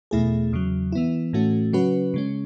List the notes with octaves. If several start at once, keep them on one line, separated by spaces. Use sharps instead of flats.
E2 B2 A3 E4 G#4
E2 C#3 F#3
E3 B3 E4
A2 E3 A3 C#4 F#4
C#3 F#3 C#4 F#4 B4
C#3 G#3 C#4